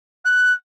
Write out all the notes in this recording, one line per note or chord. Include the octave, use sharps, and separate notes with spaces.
F#6